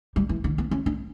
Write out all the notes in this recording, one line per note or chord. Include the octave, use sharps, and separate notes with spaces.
G3
E3
D3
B3
C#4
D4